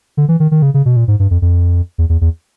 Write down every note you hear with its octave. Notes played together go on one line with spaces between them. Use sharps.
D3
E3
D#3
D#3
C#3
C#3
B2
A#2
G#2
G2
F2
F2
E2
E2
E2